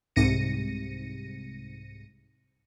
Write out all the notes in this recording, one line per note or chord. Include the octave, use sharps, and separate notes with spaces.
C2 G#2 C3 A#6 C#7 D#7